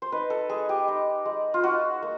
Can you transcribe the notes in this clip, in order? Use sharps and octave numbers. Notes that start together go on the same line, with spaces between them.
C5
D#4 B4
A4
G#3 G#4
G4
D#4
G#3
F4
D#4 F#4
A#3